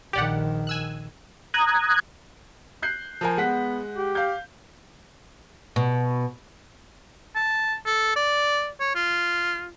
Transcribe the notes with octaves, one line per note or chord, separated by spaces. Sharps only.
A#1 D#3 G4 D5 F#5
G#5 E6 F#6
A#5 D#6 F#6 G#6
F#6 G6 C7
F3 A#4 G#5
G#3 B3 F#5 B6
G4
F5 G6
B2
A5
A4
D5
C#5
F4